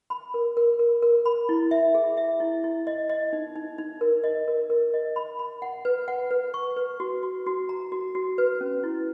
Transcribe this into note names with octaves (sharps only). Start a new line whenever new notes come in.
B5
A#4
A#4
A#4
A#4
B5
E4
E5
G#4
E5
E4
E4
D#5
D#5
D#4
D#4
D#4
A#4
D#5
A#4
A#4
D#5
B5
B5
F#5
B4
F#5
B4
C#6
B4
F#4
F#4
F#4
A#5
F#4
F#4
B4
C#4
E4